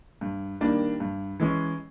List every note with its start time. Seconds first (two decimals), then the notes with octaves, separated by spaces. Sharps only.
0.21 G2
0.61 D#3 G3 A#3 D4
1.00 G2
1.40 E3 G#3 C#4